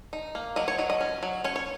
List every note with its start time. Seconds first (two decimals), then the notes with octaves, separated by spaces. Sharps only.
0.13 D#4
0.35 A#3
0.56 F#3 D#5
0.68 C#5
0.78 F#3 D#5
0.90 D#5
1.01 C#4
1.23 F#3
1.44 C#4 C#5
1.56 C#5